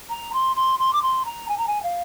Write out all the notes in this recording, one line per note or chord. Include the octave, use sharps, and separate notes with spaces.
A#5
C6
C6
C6
D6
C6
A#5
G#5
A#5
G#5
F5